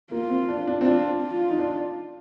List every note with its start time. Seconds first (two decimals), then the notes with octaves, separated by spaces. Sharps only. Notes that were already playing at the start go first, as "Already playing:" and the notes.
0.12 A#3 F4
0.30 C4
0.49 D4
0.67 D4
0.81 C4
0.85 D4 F4
1.22 F4
1.50 D#4
1.58 D4